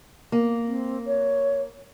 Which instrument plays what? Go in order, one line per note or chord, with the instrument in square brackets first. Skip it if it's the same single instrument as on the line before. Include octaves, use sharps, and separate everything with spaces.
[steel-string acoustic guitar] A#3
[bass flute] C4
C#5